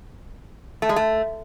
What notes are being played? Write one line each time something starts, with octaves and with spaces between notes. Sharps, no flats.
A3
G#3
A3